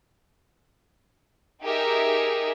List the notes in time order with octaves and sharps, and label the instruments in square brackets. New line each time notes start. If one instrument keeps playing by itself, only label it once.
[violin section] D#4 G4 G#4 A#4 E5